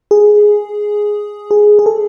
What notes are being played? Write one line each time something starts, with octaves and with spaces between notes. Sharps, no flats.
G#4
G#4
G#4
A4